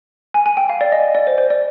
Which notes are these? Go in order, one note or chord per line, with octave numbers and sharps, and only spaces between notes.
G#5
G#5
G5
F5
D5
D#5
D5
C5
C5
D5